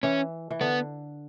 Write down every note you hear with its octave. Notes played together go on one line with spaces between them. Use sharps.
E3 C#4
E3
D3 B3